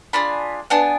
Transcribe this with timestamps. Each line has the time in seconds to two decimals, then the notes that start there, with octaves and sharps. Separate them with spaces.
0.13 D4 F4 G#4 B5
0.70 B3 D4 G#4 A5